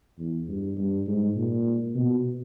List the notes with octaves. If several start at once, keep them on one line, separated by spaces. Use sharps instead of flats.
E2
G2
G2
G#2
A#2
B2